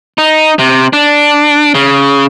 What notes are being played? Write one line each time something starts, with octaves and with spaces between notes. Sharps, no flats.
D#4
C3
D4
C#3